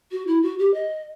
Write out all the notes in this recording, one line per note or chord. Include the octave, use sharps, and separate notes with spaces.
F#4
E4
F#4
G4
D#5